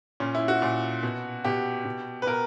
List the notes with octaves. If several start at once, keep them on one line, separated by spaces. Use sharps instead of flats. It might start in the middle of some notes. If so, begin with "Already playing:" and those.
A#2 C#4
E4
F#4
A#2
B2
B2 G4
B2
B4
B2 A#4